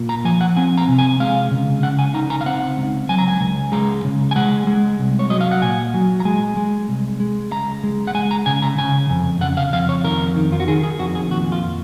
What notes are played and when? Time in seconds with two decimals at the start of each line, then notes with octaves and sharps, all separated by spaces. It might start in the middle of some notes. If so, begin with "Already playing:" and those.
Already playing: A#2
0.09 A#5
0.25 F3 G#5
0.41 F#5
0.57 C4 G#5
0.77 A#5
0.88 C3
0.99 G#5
1.20 G#3 F5
1.51 C#3
1.83 C#3 F#5
1.99 G#5
2.14 D#4 A#5
2.30 A#5
2.41 F5
2.46 C4 F#5
2.78 C#2
3.09 F#3 G#5
3.18 A#5
3.28 G#5
3.41 C#2
3.72 G#3 A#5
4.04 C#3
4.31 G#5
4.36 G#3 F#5
4.67 G#3
4.99 C2
5.19 C#5
5.30 F#3 D#5
5.41 F5
5.51 F#5
5.62 A#2 G#5
5.94 F#3
6.20 A#5
6.25 G#3 G#5
6.57 G#3
6.88 C2
7.20 G#3
7.51 C#2 A#5
7.83 G#3
8.07 F#5
8.15 G#3 G#5
8.31 A#5
8.46 C#3 G#5
8.62 A#5
8.78 C#3 G#5
9.10 F2
9.41 C#3 F#5
9.57 F5
9.73 F2 F5
9.89 C#5
10.04 D#3 A#4
10.36 D#3
10.52 F4
10.60 F#4
10.68 D#3 G#4
10.83 G#4
10.99 F2 F#4
11.15 G#4
11.31 A#2 F#4
11.52 F4